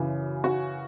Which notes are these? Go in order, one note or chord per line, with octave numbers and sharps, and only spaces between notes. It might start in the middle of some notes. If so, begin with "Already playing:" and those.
Already playing: F#2 C#3 E3
F#4